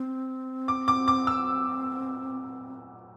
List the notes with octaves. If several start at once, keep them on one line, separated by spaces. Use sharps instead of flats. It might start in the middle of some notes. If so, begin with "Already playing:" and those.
Already playing: C4
D6
D6
D6
E6